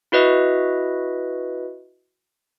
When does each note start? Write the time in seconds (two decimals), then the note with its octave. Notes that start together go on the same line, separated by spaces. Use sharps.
0.12 E4 F#4 B4 D#5 E5